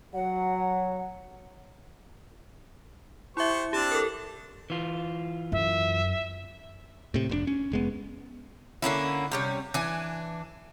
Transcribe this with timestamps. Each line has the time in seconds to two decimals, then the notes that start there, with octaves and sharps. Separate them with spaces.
0.14 F#3 F#5
3.37 E4 G4 C5 E5 C#6
3.73 C4 D4 G4 A5
3.92 A4 A#4
4.70 E3 F4
5.52 F#2 E5
7.14 A2 C3
7.29 F1 A2 D4
7.47 C#4
7.72 F1 G#3 B3
8.82 D3 A#3 C#4 E4
9.31 C3 G3 C#4
9.74 E3 D4 G#5